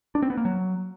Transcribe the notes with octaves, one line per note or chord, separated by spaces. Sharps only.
D4
C4
B3
A#3
F#3